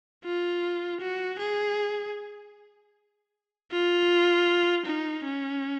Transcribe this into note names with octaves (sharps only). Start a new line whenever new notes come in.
F4
F#4
G#4
F4
D#4
C#4